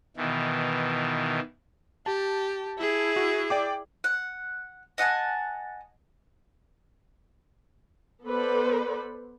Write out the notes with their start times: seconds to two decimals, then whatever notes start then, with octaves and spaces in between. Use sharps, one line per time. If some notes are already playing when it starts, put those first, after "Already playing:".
0.17 B2 D#3 E3
2.06 G4 A5
2.78 E4 G#4
3.16 F#4
3.50 D5 G5 D6
4.04 F#5
4.98 D#5 F#5 G#5 A5
8.25 B3 A4 B4 C5 D5 B5